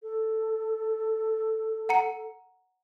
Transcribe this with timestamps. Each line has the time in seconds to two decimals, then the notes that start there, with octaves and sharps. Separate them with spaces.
0.03 A4
1.89 F#5 A#5 C#7